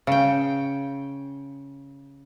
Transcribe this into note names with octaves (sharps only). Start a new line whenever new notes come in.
C#3 G5